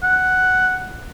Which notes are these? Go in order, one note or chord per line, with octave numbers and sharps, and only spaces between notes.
F#5